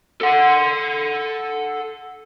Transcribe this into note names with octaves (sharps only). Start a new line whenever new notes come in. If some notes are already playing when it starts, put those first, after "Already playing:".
A4 F#5